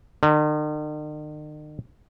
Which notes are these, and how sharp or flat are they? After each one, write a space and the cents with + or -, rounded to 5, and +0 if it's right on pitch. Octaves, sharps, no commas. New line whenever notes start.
D#3 -45